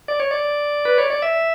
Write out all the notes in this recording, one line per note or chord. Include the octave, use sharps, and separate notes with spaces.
D5
C#5
D5
B4
C#5
D5
E5